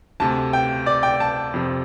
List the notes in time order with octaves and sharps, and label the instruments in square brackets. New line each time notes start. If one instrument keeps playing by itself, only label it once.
[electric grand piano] D2 C3 A3 [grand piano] A5
[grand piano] G5
D5
G5
A5
[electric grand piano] F2 C3 F3